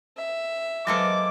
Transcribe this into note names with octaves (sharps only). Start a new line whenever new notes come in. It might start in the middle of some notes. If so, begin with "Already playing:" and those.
E5
F#3 G#3 A#3 A4 B4 C5 D6